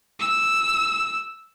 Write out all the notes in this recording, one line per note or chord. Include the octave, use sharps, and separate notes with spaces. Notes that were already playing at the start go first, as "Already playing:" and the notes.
E6